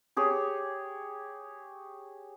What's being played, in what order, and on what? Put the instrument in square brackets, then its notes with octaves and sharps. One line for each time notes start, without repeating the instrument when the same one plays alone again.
[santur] G4 G#4 C#5